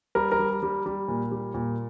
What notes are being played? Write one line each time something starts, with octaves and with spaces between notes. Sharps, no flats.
G3 A#4
A#4
G3
G3
G3
A#2
G3
A#2